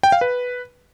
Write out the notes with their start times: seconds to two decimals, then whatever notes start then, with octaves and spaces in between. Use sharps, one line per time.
0.03 G5
0.12 F5
0.21 B4